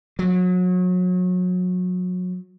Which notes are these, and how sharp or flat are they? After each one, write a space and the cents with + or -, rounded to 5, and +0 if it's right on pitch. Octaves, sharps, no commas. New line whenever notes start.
F#3 -30